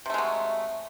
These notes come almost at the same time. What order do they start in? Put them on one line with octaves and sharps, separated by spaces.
C3 A3 G#3 F#3